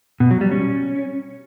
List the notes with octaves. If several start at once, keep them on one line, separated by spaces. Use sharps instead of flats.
B2
F#3
G3
C#4